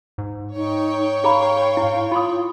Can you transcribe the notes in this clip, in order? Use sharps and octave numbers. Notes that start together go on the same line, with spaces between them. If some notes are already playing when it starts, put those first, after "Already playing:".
G#2
D#4 C#5 G5
G#4 F5 A#5 B5
E4
F4 B5 C6 D#6